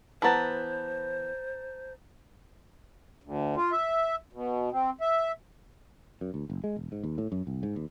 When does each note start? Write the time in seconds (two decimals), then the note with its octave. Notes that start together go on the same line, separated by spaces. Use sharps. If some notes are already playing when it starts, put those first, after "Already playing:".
0.22 E3 B3 C5 A5 A#5 A6
3.24 D2
3.56 F4
3.72 E5
4.33 B2
4.72 C4
5.01 E5
6.21 F#2
6.34 D2
6.50 F#1
6.64 G#3
6.76 E1
6.92 G#2
7.04 D#2
7.18 A2
7.32 F#2
7.47 C2
7.63 G#2
7.76 D#2